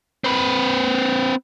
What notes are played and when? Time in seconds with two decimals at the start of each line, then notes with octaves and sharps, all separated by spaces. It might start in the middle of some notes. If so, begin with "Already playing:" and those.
0.24 C4 B4